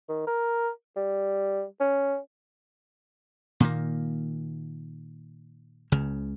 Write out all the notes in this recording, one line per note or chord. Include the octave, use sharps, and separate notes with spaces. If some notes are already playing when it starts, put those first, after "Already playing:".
D#3
A#4
G3
C#4
A#2 D#3 A#3
C#2 C#3